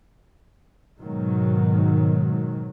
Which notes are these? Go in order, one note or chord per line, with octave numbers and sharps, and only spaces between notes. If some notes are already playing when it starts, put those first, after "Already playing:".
G#2 B2 D#3 F#3